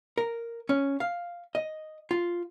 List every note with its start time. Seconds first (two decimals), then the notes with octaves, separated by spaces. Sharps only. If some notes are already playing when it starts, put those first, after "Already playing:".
0.18 A#4
0.69 C#4
1.00 F5
1.55 D#5
2.11 F4